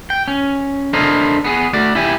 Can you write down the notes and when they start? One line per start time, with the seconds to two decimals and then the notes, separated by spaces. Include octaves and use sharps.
0.10 G5
0.28 C#4
0.93 D4 E4 A4 A#4 C5 D#5
1.44 B3 G#4
1.73 A3 F#4 D5
1.95 E4 G4 G#5